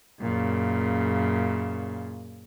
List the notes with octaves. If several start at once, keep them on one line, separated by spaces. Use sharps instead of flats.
F#2 A#2 C#3